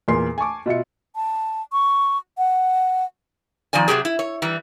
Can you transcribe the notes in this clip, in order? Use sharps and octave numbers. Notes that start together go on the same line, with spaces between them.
E2 A#2 A#4 C6 C7
G#5 A5 C#6 D6
B2 F4 E5 C#7
A5
C#6
F#5
D#3 F3 C4 D5 G#5
C3 F3 F#3 G4 G#4
E4
C#5
E3 G3